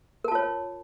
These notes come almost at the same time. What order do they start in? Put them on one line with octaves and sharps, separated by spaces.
A#4 A5 F4 C#5